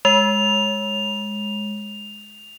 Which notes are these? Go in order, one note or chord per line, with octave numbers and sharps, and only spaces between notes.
G#3 F7